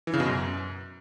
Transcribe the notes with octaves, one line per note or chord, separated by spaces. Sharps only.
E3
C#3
B2
F#2